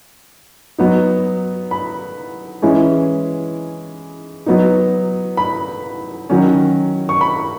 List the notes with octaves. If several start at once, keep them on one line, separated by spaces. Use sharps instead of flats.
F#3 B3 D#4
B5
E3 G#3 C#4 E4
F#3 B3 D#4
B5
D#3 F#3 C#4
C#6
B5